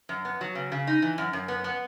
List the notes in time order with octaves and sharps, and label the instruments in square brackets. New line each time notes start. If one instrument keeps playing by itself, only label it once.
[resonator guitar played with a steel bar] F#2
B3
F#3
C#3
C#3
D#4
E3
F#2
F#2
B3
B3